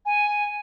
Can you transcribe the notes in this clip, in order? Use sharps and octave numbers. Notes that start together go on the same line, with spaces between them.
G#5